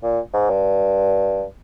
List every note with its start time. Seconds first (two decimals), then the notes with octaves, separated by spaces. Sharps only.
0.04 A#2
0.34 G#2
0.50 G2